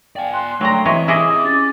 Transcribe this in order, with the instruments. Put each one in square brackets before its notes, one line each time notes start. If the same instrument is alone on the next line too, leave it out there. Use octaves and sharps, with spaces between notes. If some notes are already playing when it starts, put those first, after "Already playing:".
[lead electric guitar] D5 G#5 [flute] F5 [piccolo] G5
[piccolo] C6 [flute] F#6
[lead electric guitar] D3 A3 [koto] F#3 A#5 [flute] G5
[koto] E3 C#5 D#5 [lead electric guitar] C4 G4 [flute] E5
[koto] E4 G#4 D#5 [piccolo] D6 [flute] D#6
[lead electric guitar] C#4 [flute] A6